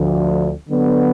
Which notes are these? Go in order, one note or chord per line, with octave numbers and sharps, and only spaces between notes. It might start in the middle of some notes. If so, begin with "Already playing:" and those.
Already playing: D2 D3 F3
D3 F#3 B3